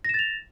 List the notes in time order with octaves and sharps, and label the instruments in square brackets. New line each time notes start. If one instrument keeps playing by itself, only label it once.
[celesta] A#6
E7
A6
F7